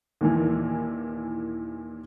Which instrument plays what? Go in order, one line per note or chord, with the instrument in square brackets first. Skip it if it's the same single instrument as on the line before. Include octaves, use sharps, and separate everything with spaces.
[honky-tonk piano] D#2 A#2 E3